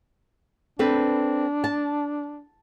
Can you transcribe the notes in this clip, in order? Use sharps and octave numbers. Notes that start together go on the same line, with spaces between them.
C4 D4 A4 B4
A5